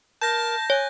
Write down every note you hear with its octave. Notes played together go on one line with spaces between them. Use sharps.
A#4 A5 G6 A#6
C#5 G#5